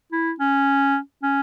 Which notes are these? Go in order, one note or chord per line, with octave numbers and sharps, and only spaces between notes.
E4
C#4
C#4